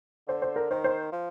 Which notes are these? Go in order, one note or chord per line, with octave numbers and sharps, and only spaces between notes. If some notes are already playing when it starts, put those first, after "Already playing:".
D3 C5
C5
A#4
D#3 C5
C5
F3